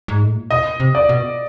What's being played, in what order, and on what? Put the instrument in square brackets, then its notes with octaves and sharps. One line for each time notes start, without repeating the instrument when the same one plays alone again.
[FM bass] G#2
A2
A#2
[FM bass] B2 [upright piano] D#5
[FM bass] C3
[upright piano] D5
[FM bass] B2